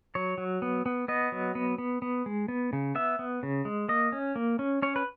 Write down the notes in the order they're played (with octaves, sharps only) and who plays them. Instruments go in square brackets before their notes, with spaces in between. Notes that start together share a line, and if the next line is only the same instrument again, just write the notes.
[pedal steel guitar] F#3 C#5
F#3
B3
B3
B3 D#5
F#3
B3
B3
B3
G#3
B3
C#3
B3 E5
B3
C#3
G#3
A#3 D#5
C#4
A#3
C#4
C#4 C#5
B4